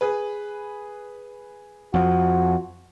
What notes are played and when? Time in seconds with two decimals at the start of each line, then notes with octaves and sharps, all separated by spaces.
0.01 G#4 B4
1.94 F2 F3 F#4